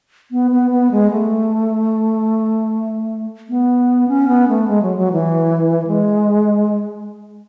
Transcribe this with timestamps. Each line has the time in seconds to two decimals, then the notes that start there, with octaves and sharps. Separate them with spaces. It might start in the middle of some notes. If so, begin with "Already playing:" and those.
0.31 B3
0.51 B3
0.71 B3
0.91 G#3
1.11 A3
3.49 B3
4.08 C#4
4.28 B3
4.48 A3
4.68 G#3
4.83 F#3
4.97 F#3
5.12 E3
5.87 G#3